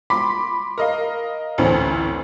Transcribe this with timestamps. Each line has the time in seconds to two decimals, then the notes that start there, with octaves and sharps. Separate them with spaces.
0.10 B5 C6 D6 B6
0.78 A#4 D#5 F5
1.58 A1 D2 E3 C4 C#4